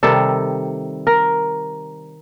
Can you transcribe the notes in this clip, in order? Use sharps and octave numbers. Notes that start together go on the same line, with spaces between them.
C3 D#3 G3 A4
A#4